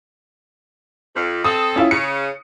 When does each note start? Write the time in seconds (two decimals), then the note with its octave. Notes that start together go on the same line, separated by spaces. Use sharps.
1.15 F2
1.44 C4 A4 D#6
1.76 C#4 E4 F4
1.91 C#3 C#7